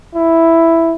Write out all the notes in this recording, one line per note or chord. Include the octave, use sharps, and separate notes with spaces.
E4